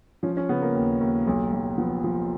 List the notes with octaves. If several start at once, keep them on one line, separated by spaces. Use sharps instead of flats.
F3 C#4
C#4
C#3 B3
A#3
D#2
D#2
B1
B1
F3 B3
F3